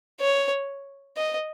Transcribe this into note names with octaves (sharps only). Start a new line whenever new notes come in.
C#5
D#5